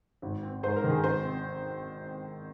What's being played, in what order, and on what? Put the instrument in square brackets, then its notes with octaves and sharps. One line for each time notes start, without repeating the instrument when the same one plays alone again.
[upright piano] G#1
C4
G#2 C5
A#4
D#3
G#4
G#1 C5
C4